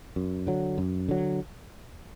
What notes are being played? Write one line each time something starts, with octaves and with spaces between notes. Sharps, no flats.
F#2
D3 F#3
F#2
D3 F#3